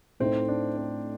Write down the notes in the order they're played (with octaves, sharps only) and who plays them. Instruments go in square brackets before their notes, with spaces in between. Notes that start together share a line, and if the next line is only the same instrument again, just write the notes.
[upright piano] A2 A3 D#4 [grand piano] C4
[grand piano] D4
C4